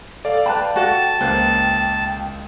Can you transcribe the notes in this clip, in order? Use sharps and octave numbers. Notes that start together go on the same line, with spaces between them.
A4 D5 F5
B4 G5 A5 B5
F#4 A4 F#5 G5 A5
C#2 A#3 B4 C5